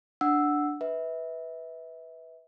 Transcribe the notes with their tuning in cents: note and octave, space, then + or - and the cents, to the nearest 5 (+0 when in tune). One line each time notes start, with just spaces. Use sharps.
D4 +5 F#5 +0 E6 +0
B4 +0 E5 -30